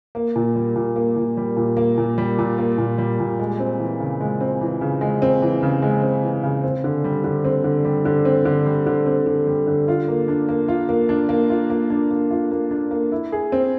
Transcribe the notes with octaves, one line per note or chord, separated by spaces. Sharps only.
A#3
A#2
G3
A#2
A#3
A#2
G3
A#2
A#3
A#2
G3
A#2
A#3
A#2
G3
A#2
G#3
C4
E3
C#3
G#3
C4
E3
C#3
G#3
C4
E3
C#3
G#3
C4
E3
C#3
C4
D3
G3
D3
C4
D3
G3
D3
C4
D3
G3
D3
C4
D3
G3
D3
F4
A#3
D4
A#3
F4
A#3
D4
A#3
F4
A#3
D4
A#3
F4
A#3
D4
A#3
E4
G#4
C4